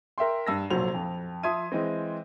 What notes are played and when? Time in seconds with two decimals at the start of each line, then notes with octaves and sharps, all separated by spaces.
0.18 A#4 E5 G5 C6
0.46 G2 E6 A#6
0.70 F1 B1 A#2 F#3 C5 F7
0.94 F2
1.43 F3 E5 C6 D#6 G#6 D#7
1.72 E3 G#3 C4